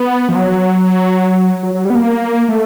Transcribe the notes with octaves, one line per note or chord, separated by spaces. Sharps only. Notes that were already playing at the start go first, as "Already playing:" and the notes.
Already playing: B3
F3
F#3
F#3
F#3
G3
B3
A#3
A3